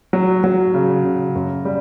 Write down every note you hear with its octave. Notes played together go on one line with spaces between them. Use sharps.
F#3
F#3
C#3
C#3
F#2
G3